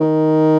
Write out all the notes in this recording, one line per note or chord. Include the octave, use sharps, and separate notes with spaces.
D#3